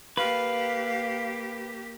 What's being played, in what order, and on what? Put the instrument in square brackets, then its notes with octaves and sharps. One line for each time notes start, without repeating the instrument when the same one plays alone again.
[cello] A#3 G4 [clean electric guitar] B4 [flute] F5